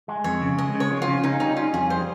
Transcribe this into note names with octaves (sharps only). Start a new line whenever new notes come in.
G#3
F2 C#5
C#3
G#3 D#5
C#3
C#5
F3
F4
C#3
C#4 D#4
G3 D#4
C#4 F4
F2 G#4
G3 C5